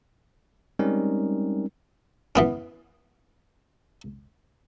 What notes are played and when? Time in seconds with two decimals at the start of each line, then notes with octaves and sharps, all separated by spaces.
0.79 G3 G#3 C4 C#4 D#4 A#4
2.36 E3 B3 C#4